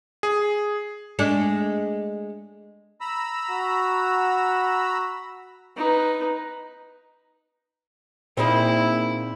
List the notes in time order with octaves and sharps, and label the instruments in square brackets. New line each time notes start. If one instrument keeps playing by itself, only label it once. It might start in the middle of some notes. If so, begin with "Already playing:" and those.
[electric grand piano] G#4
[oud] G#3 A3 D4
[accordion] A#5 B5 E6
[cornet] F#4
[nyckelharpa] D#4 B4
[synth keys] A#2 [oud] C4 D#4 G#4 [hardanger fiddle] E4